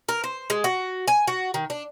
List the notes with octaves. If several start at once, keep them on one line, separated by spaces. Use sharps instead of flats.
A#4
C5
G#3
F#4
G#5
F#4
D#3
D4